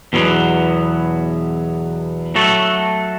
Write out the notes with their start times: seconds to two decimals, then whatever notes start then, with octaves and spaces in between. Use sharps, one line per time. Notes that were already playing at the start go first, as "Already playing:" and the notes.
0.13 E2 B2 F#3 B3
2.35 F#3 A3 F#4 A4